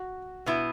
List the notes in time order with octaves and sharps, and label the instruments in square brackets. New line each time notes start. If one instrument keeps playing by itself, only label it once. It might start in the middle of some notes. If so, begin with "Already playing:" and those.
Already playing: [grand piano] F#4
[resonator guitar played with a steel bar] B2 B3 E4